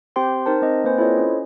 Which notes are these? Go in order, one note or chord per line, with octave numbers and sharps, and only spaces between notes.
C4 G4 C5 G5 C6
D#4 A#4 C5 A5
C4 D#5
A#3 C4 B4 C5 G#5
E4 F4 A4 C5 C#5 D#5
C#4